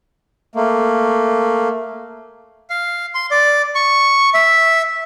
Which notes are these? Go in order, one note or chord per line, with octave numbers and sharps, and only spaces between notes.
A3 A#3
F5
C6
D5
C#6
E5